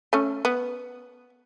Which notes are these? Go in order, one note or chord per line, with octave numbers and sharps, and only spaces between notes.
A3 C#4
B3